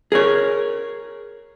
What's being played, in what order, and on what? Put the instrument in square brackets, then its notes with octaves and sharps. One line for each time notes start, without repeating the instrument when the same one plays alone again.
[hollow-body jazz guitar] G#4 A#4 C#5